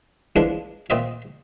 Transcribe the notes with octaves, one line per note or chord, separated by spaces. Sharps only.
E3 F3 G#3 A#3 D4
A#2 C4 D#5 E5